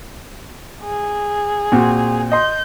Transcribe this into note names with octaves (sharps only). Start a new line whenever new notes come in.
G#4
A#2 C4 F#4
D#5 C6 G6